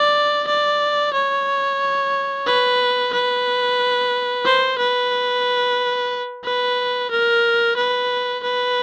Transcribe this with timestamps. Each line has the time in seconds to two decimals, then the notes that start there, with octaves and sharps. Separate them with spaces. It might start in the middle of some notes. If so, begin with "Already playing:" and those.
Already playing: D5
0.48 D5
1.14 C#5
2.46 B4
3.13 B4
4.45 C5
4.79 B4
6.45 B4
7.11 A#4
7.77 B4
8.43 B4